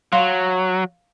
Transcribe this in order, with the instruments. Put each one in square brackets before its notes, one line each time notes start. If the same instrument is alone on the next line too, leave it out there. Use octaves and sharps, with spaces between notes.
[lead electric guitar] F#3 [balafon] F5 C6